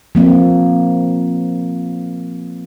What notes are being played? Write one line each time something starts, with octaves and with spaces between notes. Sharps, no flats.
F3 A#3 C4